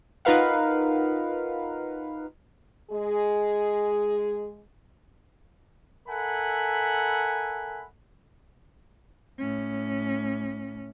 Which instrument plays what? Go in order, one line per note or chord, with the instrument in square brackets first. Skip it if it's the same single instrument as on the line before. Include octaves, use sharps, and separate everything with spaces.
[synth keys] D#4 F4 A#4 B4 F5 F#5
[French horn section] G#3 G#4
[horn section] A4 A#4 E5 F#5 G#5 B5
[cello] A2 C#4